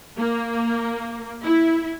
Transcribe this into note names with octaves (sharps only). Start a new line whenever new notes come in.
A#3
E4